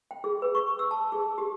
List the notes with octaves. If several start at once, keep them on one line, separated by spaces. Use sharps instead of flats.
G5
G#4
B4
C#6
E6
A5
G#4
G4